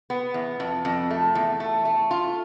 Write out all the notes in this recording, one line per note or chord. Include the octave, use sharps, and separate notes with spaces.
B3
E2
F2
F2
A3
E2
A3
A3
F4